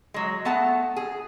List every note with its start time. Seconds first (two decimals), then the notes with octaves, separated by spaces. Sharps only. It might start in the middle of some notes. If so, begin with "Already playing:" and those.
0.14 F#3 G#3
0.45 A3 B3 F#5 A5
0.96 G#4